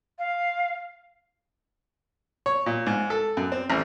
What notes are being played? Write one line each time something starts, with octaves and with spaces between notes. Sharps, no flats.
F5
C#5
A#2
G#2
A4
F#2
C4
A1